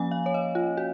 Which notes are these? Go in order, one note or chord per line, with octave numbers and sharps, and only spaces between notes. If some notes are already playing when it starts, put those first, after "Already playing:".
Already playing: F3 A#3 C#4 G#5
F5
C#5
D#5
F4
F#4